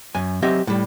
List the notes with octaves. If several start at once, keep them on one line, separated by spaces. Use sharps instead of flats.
F#2 G#5
F#3 C4 G4 D#5 E5
A2 G3